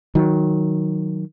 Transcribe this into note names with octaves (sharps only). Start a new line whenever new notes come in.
D#3 F#3